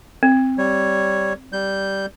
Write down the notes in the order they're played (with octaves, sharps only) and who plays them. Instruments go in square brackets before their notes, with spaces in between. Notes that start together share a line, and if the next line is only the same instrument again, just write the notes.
[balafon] C4
[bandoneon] G3 C#5
G3 G6